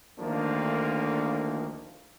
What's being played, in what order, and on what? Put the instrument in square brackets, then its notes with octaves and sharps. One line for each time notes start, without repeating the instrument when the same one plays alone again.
[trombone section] D2 D#3 F3 A3 A#3 D4